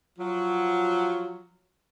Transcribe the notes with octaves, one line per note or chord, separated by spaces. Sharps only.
F3 F#3